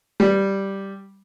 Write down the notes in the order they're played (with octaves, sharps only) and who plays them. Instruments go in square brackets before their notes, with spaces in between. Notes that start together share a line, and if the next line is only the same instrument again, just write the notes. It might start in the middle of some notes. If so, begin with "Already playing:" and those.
[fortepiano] G3